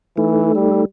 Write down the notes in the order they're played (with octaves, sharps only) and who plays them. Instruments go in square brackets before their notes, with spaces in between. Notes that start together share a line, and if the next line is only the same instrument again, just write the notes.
[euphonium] E3 [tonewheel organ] A3 D#4 A4
[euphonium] G3